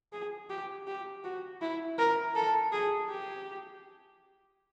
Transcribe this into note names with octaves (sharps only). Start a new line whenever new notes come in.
G#4
G4
G4
F#4
E4
A#4
A4
G#4
G4